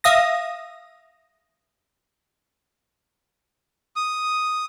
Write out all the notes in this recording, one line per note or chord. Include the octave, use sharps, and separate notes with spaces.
E5 F5 D#6 A#6
D#6